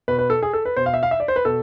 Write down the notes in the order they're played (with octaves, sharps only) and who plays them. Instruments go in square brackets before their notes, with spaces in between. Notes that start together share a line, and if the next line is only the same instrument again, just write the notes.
[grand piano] B2 B4
B4
A4
G#4
A4
B4
B2 C5
F5
E5
F5
E5
D5
C5
B4
B2 A4